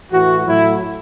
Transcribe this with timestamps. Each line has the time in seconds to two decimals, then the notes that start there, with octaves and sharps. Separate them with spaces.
0.12 A2 E3 F#4
0.47 A2 F#3 E4